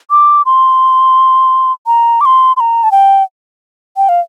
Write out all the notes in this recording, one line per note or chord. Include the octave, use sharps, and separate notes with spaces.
D6
C6
A#5
D6
C6
C6
A#5
A5
G5
G5
F5